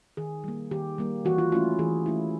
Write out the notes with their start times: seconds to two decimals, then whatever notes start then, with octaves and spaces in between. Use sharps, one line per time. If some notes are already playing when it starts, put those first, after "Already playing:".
0.17 D#3 G#4
0.44 G3 A#3
0.71 D#3 G4
0.98 G3 A#3
1.25 E3 F#4
1.38 F4
1.52 A3 C#4 E4 F4
1.79 E3 G#4
2.06 A3 C#4 E4